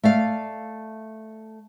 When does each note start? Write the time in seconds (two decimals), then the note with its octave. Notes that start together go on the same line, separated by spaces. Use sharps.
0.04 A3 D5 F5